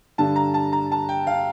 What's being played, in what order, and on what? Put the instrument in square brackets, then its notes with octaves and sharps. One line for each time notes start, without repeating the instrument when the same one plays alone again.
[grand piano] G2 D3 G3 A5
A#5
A5
A#5
A5
G5
F5